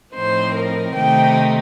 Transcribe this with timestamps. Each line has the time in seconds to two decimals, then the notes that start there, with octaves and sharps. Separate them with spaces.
0.14 A2 F3 C4 D#4 C5
0.54 A#4
0.95 C3 D#3 A3 C4 D#4 G5